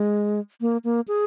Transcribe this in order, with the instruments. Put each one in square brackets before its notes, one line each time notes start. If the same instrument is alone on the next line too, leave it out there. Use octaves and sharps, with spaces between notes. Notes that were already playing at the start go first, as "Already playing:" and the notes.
Already playing: [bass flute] G#3
A#3
A#3
G#4